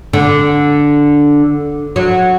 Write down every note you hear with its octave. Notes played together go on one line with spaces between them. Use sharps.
D3
F#3